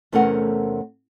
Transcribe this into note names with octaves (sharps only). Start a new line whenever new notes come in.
E2 C3 A3 C#4 A#4 F#5